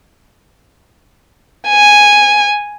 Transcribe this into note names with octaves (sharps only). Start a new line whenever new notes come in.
G#5